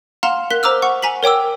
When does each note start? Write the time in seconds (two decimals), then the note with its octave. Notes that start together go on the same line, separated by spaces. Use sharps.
0.23 F5 F#5 A#5 C6 F6 E7
0.50 A#4 F#6 B6 G7
0.63 C5 A#5 D6 E6 F6
0.82 F#5 C#6
1.03 G#5 A#5 B6 F#7
1.23 A#4 C#5 G5 D6 E6